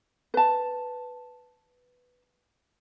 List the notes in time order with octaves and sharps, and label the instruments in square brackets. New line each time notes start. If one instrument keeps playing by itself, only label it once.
[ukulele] B4 A5